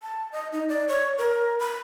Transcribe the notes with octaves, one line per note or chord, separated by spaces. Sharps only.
A5
D#5
D#4
D5
C#5
A#4
B5